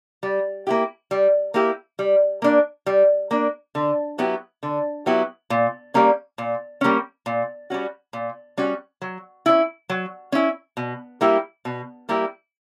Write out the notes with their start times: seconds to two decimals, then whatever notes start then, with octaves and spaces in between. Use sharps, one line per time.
0.23 G3
0.67 A#3 E4 G4
1.11 G3
1.54 A#3 E4 G4
1.99 G3
2.42 A#3 D4
2.86 G3
3.31 A#3 D4
3.75 D3
4.18 F#3 B3 E4 G4
4.63 D3
5.06 F#3 B3 E4 G4
5.50 A#2
5.94 G3 A#3 C#4
6.38 A#2
6.81 G3 A#3 C#4
7.26 A#2
7.70 G3 C#4 F#4
8.13 A#2
8.57 G3 C#4 F#4
9.01 F#3
9.46 C#4 E4
9.89 F#3
10.32 C#4 E4
10.77 B2
11.21 G3 A#3 E4 G4
11.65 B2
12.09 G3 A#3 E4 G4